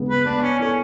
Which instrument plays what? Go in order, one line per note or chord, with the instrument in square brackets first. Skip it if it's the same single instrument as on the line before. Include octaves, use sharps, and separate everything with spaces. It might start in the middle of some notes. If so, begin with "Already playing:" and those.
Already playing: [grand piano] C#3 G#3 B3
[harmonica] B4
[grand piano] B3 [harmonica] D4
[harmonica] C#4
[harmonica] C#4 [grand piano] E4 A4